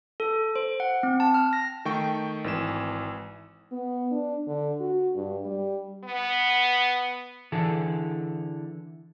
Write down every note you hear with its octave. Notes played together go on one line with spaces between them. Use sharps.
A4
C5
F#5
C4
A5
F6
A#6
D#3 A3 G5 C#6
G#1 E3 E7
B3
D4
D3
F#4
G2
G3
B3
D3 E3 G#4 A4